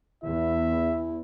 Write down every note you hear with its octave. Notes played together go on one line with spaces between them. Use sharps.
E2 E4 E5